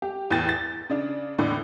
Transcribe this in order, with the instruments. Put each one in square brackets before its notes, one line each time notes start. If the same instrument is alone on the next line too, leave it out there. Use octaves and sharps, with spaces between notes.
[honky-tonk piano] G4
E2 A2 G5 G6 A6
A6
C#3 D4
E2 A2 D3 D5